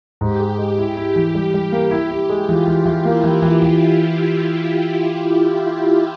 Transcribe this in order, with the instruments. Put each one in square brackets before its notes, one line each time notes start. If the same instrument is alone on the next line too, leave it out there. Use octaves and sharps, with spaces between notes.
[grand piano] G#2 [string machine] G4
[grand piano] G#3
G#3
E4
E4
E3
G3
G3
A#3
E4
E4
G#3
[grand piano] E3 [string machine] F4
[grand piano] E3
E3
[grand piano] A#3 [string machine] E4
[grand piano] E3
E3
E3